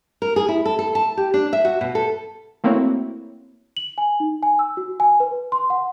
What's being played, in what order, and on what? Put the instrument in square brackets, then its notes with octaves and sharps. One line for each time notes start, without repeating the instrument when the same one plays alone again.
[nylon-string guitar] A#4
G#4
E4
A4
A4
A5
G4
D4
E5
F#4
B2
A4
[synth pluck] A3 A#3 C4 E4 F#4 C#5
[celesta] F#7
G#5
D#4
G#5
E6
F#4
G#5
B4
C6
F#5